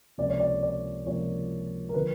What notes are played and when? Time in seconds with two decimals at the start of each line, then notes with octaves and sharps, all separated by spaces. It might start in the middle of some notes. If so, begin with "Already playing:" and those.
0.18 C#2 C3 F3 A#3 D5
0.29 C#5
0.40 D5
0.63 D5
1.06 C#2 C3 F3 A#3 C#5
1.89 A#4
1.93 D3 F3 B4